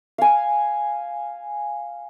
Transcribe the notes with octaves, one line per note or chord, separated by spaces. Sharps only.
F5 G#5